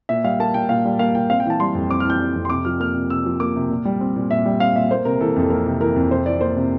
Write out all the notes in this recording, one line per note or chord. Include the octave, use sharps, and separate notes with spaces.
A#2 E5
G3 F5
A#3 A5
A#2 G5
A#2 F5
G3
A#3 F5
A#2 G5
C4 F5
G5
E3 A5
G3 C6
F2
C4 D6
F6
E3 G6
G3
F2
C6
C3 D6
F3 F6
A#3 F6
C3
C3 E6
F3
A#3 D6
C3
A#2
G3
C4
A#2
A#2 E5
G3
C4 F5
A#2 E5
A#3 C5
C3 A#4
E3 A4
F2 A4
A#3 A#4
C3
E3 A#4
F2
C3 C5
E3 D5
A#3 C5
C3